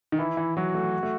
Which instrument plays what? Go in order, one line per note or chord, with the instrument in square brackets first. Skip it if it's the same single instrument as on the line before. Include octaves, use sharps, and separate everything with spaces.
[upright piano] D#3
[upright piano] E3 [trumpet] E4
[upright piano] E3
[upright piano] F#3 [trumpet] F#4
[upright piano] A3
A3